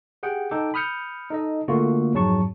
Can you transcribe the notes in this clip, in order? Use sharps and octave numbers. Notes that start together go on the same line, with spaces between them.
G4 G#4 F#5 G5
D#4 A4 G5 D6
B5 D#6 F6 G6 C#7
D#4 A4 D#5
D3 A3 A#3 F4 F#4
F2 G#2 F#3 G#4 A5 C#6